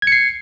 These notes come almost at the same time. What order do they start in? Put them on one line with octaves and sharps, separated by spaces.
G#6 C#7 C7